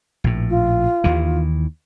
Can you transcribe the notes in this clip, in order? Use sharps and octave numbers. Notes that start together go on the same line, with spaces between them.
A#1 A2
F4
D#2 D#3 E3